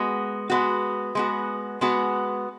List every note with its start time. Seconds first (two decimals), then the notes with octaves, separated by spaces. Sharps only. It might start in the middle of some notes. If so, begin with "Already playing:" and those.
Already playing: G#3 B3 F#4
0.50 G#3 B3 F#4
1.15 G#3 B3 F#4
1.81 G#3 B3 F#4